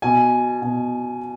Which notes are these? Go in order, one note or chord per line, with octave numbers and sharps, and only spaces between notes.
B2 G#5
B2